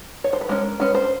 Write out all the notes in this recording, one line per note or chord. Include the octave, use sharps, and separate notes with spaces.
C#5
C5
B4
G#3 C#4 A#4
G#3 C#4 B4
C5